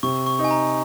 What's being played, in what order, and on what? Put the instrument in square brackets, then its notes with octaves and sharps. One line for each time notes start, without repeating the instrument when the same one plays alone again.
[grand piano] C3 [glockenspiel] C#6
[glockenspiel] C#6
[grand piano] D#4
[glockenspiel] G#5
A#5